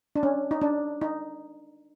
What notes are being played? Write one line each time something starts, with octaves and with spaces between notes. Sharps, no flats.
D4
C#4
D#4
D4
D#4